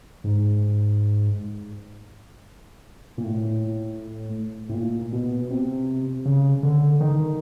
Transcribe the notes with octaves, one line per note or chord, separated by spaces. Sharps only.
G#2
A#2
A2
A2
A#2
B2
C3
C#3
D3
D#3